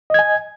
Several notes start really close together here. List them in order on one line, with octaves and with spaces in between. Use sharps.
D#5 G#6 G#5